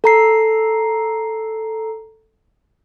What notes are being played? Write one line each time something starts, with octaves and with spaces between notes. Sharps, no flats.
A4 A#5 C7